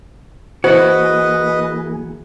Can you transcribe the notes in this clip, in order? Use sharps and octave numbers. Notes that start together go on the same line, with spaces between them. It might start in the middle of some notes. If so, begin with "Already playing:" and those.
E3 A#3 E4 F#4 G#4 B4 C5 D#5